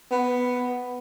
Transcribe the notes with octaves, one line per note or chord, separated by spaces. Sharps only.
B3